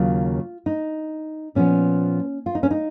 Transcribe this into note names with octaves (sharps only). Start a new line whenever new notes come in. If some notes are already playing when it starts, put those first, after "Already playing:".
Already playing: D#2 C#3 F#3 F4
D#4
A#2 F3 B3 C#4
F4
D#4
C#4
D#4